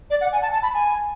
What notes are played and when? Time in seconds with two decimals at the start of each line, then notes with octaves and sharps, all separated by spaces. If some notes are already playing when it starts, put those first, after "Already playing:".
0.10 D5
0.21 F#5
0.32 G#5
0.42 A5
0.53 A5
0.63 B5
0.74 G#5